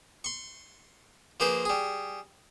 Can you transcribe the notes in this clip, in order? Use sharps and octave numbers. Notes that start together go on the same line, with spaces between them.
C6 C#6
F3 A#3 G#4 B4 C5
G3 G#4